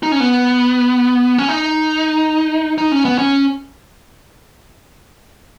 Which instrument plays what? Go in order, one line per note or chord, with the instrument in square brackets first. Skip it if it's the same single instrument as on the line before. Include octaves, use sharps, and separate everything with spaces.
[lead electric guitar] D#4
C#4
B3
C#4
D#4
D#4
C#4
B3
C#4